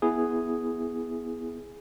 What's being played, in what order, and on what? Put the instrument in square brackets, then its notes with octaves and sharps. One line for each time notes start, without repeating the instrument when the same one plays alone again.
[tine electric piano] B3 E4 G#4